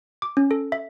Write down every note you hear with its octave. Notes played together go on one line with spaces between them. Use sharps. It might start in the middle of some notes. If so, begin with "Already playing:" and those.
D6
C#4
A4
E5